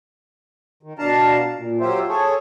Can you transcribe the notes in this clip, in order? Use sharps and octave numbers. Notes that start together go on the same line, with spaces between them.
D#3
B2 D4 F5 A5 A#5
A#2
F#3 F4 G4 C5 E5
G#4 A4 C#5